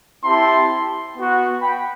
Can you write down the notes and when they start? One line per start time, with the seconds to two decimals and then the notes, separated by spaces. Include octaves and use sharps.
0.23 C4 E4 G4 A5 C6
1.16 B3 F#4
1.61 G5 B5